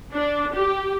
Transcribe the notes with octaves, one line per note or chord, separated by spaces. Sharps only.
D4
G4